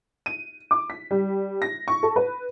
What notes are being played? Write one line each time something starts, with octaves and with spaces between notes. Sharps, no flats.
D#7
D6
B6
G3
A#6
C#6
A4
B4